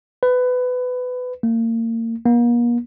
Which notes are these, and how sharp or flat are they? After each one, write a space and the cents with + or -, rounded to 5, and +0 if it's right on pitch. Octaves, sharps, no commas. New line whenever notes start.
B4 +20
A#3 -35
A#3 +40